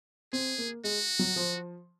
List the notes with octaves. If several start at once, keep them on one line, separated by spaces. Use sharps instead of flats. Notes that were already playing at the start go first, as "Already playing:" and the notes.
C4 G#4
A#3
G#3 F#4
F#3
F3